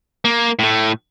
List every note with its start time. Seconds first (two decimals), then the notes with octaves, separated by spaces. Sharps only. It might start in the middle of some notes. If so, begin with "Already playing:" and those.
0.25 A#3
0.59 A2 A3